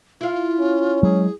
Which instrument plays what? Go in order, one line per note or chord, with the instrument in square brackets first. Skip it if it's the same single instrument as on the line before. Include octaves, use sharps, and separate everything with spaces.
[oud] E4 F5 [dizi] F4
[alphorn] C#4
[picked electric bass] F#3 G#3 [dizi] G#4